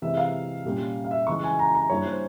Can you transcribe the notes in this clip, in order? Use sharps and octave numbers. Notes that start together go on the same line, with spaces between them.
C3 E3 G#3 E5
F5
A#2 G3 A#3 C#4
F5
E5
C#3 E3 G#3 C#6
G#5
A#5
A#5
G2 G3 A#3 E4 C#5
C5